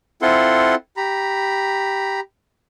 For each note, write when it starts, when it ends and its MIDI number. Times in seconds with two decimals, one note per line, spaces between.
0.22 0.75 60
0.22 0.75 64
0.22 0.75 65
0.22 0.75 69
0.22 0.75 78
0.22 0.75 84
0.97 2.20 67
0.97 2.20 82
0.97 2.20 83